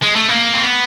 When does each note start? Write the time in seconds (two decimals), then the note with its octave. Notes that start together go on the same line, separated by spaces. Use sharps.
0.03 G#3
0.15 A3
0.29 A#3
0.54 C4
0.64 B3